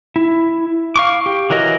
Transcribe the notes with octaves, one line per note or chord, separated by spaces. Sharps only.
E4
F5 C#6 D6
G4
E3 F#3 A#4 D#5